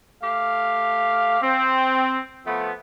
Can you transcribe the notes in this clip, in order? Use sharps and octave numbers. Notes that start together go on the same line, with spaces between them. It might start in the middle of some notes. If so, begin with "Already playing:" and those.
A3 G4 F5
C4
F3 A3 B3